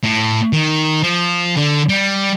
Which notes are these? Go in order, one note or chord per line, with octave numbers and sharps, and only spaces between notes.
A2
D#3
F3
D3
G3